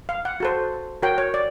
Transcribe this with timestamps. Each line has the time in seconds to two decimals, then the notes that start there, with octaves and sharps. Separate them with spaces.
0.09 F5
0.25 F#5
0.40 F#4 A4 C5
1.02 F#4 A#4 C#5 G5
1.18 C#5
1.34 D5